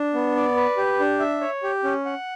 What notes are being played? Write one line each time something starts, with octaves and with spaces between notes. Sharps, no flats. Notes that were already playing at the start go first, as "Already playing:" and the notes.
Already playing: D4
B3
D5
B4
G4
D4
E5
C#5
G4
C#4
F#5